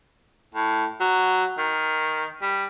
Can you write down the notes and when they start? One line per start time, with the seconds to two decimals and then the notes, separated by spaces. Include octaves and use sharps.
0.55 A2
1.01 F#3
1.58 D#3
2.42 G3